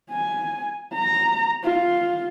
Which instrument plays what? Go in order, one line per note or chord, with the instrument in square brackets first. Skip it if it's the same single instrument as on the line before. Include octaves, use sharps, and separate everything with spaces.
[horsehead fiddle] G#5
A#5
F4